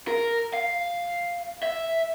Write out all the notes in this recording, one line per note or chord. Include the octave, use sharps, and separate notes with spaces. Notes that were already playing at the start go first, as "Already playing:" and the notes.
A#4
F5
E5